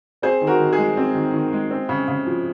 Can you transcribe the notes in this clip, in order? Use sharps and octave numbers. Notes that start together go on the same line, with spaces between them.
C4 G#4 C5
D#3
F#4 A#4
D#3
G#4
G#3
C4
D#3
D#3
G#3
C4
C#3
C#3
F3